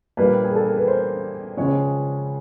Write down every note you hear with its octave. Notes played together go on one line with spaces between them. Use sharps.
A#1 A#2 G3 A#3 B4
G#4
A4
A#4
B4
C5
C#2 C#3 F3 G#3 C#5